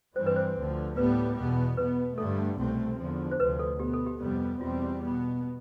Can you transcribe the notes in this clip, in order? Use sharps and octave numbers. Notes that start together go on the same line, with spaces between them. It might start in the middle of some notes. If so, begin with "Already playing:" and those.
G2 E3 G3 C4 C5
B4
C5
D2 D3 F3
A2 G3 B3 B4
E2 B2 B3
B2 B3 B4
G2 D3 A3 A4
C2 B2 A3 C4
E2 D3 F3
C5
D2 C3 F3 B4
A4
B2 B3 G4
A4
G4
F2 C3 G3 B3
E2 B2 G3 C4 F4
B2 B3